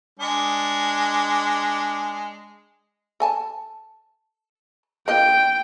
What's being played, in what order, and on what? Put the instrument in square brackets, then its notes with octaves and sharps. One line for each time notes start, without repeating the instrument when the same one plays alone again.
[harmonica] G#3 D4
[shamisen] A4 G#5 A5
[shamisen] A#3 F4 D#5 [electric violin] G5